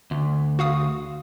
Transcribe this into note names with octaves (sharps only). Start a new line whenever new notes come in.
D2
F#4 F5 D#6